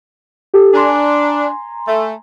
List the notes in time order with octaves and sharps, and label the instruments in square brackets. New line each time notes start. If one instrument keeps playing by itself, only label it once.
[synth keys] G4 A4
[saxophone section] D4 [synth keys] G#5 A#5 C6
[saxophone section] A3